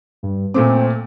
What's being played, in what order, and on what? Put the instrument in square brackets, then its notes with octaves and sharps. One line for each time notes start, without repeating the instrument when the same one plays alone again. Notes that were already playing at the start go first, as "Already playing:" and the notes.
[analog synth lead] G2
[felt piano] A#2 A3 D6 [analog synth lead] C4